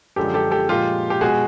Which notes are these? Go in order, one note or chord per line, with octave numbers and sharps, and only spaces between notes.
F#2 D3 F3 G#3 G4 A4
G4 A4
G4 A4
A#2 F3 G#3 F4 G4
G4
B2 G#3 F#4 G#4